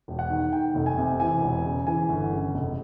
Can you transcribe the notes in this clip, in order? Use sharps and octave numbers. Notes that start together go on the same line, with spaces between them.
E1
F#5
D#3
D#3 G5
F1
G#5
C3
E3 G#5
E1
C#3
E3 G#5
G1
C#3
F1